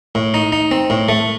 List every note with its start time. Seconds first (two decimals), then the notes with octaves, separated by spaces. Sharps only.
0.15 A2
0.34 D#4
0.52 D#4
0.71 C4
0.90 A2
1.08 A3